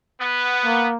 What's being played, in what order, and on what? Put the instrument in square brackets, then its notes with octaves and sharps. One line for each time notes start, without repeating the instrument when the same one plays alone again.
[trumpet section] B3
[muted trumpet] A#3